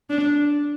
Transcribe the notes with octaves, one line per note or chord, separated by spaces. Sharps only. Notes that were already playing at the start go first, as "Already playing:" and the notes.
D4